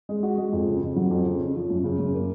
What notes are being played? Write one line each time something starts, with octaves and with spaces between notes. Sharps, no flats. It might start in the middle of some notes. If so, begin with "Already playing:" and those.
G#3
F#4
G#3
F2
C#3
F2
F#3
F2
C#3
C#4
F3
F#2
C#3
F#2
A#3